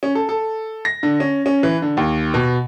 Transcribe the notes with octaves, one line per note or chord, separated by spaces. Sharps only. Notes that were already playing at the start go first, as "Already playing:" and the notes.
C#4
A4
A4
A#6
D3
C#4
C#4
E3
D3
D#2
B2